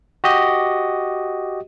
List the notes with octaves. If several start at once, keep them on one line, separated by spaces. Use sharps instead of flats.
F#4 G4 D#5